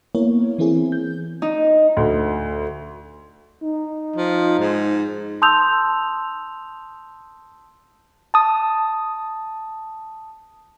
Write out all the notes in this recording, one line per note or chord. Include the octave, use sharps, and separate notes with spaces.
A#3 B3 E4 A#4 C#5
E3 B3 C4 E4 G#4
G6
D#4
D2
D#4
F3
G#2
A5 C6 D#6 E6 G6 F7
A5 D#6